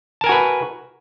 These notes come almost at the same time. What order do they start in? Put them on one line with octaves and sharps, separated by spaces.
A5 A#4 G#5 F#4 B4